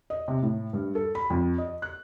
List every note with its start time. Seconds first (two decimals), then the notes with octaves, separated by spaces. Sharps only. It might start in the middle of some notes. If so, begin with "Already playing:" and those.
0.10 D#5
0.28 C3
0.42 A2
0.73 G2
0.95 A4
1.15 B5
1.30 F2
1.58 D#5
1.82 F#6